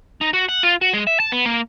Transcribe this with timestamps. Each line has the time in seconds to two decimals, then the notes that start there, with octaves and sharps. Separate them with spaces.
0.21 D#4
0.33 F#4
0.49 F#5
0.63 F4
0.82 F#4
0.94 G#3
1.07 E5
1.20 A5
1.32 B3
1.45 A#3